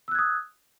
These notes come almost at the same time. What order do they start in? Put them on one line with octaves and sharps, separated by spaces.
E6 F#6 G#6 D#6